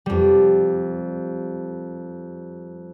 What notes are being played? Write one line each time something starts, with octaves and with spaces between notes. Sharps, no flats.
F2 G3